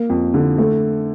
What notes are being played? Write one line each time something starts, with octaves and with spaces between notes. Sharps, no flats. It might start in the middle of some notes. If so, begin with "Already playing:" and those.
Already playing: A#3
F2
D3
A3